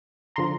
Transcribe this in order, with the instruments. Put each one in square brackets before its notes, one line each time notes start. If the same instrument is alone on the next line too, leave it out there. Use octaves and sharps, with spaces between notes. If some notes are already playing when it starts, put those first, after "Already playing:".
[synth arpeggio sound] D3 F3 A#5 C6